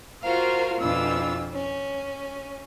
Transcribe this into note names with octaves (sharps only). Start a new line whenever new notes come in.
F4 F#4 A#4 C5 F5
F2 B2 E3 D4 F4 E6
C#4